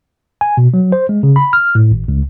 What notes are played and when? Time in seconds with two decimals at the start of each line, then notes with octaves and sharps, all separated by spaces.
0.41 G#5
0.57 B2
0.74 F#3
0.92 C5
1.09 G#3
1.23 C#3
1.36 B5
1.53 F6
1.75 A2
1.91 G#1
2.08 C#2